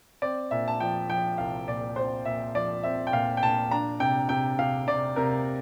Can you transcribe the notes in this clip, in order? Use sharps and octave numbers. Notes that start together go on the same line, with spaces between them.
C4 D5
A#2 E5
A5
F3 G5
F3 G5
C2 F5
A#2 D5
C4 C5
A#2 E5
F3 D5
C4 E5
G5
A#2 F5
G5
A#2 A5
D4 A#5
C3 G5
C3 G5
C3 F5
C3 D5
C3 A#4